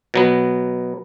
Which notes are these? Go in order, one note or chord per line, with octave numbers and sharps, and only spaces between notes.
B2 F#3 B3